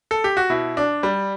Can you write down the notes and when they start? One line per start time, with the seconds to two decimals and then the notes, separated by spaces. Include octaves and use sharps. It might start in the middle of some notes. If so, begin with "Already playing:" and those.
0.11 A4
0.24 G4
0.37 F#4
0.50 B2 E4
0.77 D4
1.03 G3